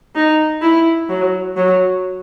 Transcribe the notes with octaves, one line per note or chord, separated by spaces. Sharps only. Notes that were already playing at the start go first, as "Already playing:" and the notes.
D#4
E4
F#3
F#3